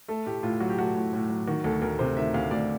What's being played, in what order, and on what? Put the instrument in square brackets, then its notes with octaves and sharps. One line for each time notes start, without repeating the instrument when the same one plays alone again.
[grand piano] A3 A4
A2 G4
A2 F4
F#3 F#4
G4
A3 F#4
A2
A2
F#3
D#3 F#4
D2 A4
D2 A#4
C3 C5
D#3 E5
D2 F5
D2 D5